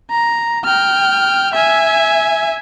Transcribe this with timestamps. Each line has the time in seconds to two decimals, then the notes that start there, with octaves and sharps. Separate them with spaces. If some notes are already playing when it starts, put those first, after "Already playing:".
0.11 A#5
0.65 G5 F6
1.54 E5 G#5